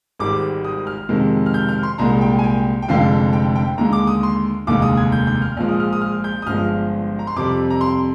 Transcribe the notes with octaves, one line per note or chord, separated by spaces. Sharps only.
G#1 G#2 D#3 G3 D6
D#6
F6
F2 C3 D#3 G#3
F6
G6
F6
C6
C2 A#2 G#3 A#5
G5
G#5
G5
G5
F1 F2 D3 G#3 F5
G5
G5
D#2 D3 G#3 A#5
D6
D#6
C6
F1 D#2 D3 G#3 D6
D#6
G#6
G6
G6
F6
A#1 A#2 F3 G#3 F6
D#6
F6
D#6
F6
G6
D#6
G1 G2 F3 G#3 F6
A#5
C6
F2 C3 G3 D6
A#5
C6